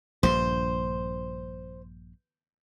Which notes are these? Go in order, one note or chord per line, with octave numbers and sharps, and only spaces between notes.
A#1 G2 C5